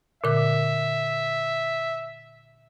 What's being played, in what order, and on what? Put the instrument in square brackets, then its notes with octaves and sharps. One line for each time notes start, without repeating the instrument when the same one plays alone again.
[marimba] A#2 D3 D6 [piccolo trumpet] E5